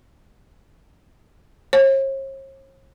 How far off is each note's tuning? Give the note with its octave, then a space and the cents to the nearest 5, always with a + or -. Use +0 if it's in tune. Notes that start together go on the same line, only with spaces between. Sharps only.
C#5 -45